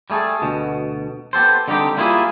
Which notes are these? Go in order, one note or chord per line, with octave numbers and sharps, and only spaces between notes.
G3 A3 G#4 A4
D2 B2
B3 G4 A4 C5
D3 G3 C4 D#4 F4 G4
G3 A#3 E4 F4 G4 G#4